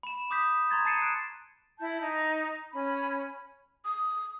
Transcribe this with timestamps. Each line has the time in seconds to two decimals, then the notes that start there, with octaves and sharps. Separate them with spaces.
0.03 B5 E7
0.31 D6 D#6 G6 B6
0.70 A#5 C6 G#6 A6
0.85 A5 A6 C7 C#7 D#7 E7
1.02 F#6 D7
1.79 E4 A5 G6
2.00 D#4
2.73 C#4 B5
3.85 D#6